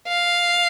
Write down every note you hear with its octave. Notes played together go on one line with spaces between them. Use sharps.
F5